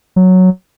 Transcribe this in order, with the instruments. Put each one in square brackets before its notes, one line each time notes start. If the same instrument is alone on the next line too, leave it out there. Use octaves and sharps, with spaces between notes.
[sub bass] F#3